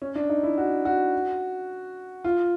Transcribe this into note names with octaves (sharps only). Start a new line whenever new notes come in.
C#4
D4
D#4
E4
F#4
F#4
F4